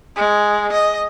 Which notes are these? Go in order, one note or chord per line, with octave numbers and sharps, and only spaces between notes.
G#3
D#5